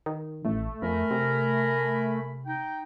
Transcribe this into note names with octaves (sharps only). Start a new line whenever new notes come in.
D#3
A1 A3
F2 A#4 G#5 B5
C3
D#4 G5